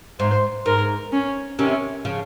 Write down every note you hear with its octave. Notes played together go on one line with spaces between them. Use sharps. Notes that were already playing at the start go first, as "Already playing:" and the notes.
G#2 C5
G#2 A#4
C#4
C3 D#3 C#4
C#3 F3